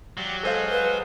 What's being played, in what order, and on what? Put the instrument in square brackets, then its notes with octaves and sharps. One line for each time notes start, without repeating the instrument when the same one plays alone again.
[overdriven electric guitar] F#3 [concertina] G4 D5 F5
[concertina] G#3 G#5 D#6 [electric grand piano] A4 C5 F5
[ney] B4